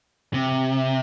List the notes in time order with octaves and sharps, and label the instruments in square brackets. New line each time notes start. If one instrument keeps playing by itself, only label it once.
[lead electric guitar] C3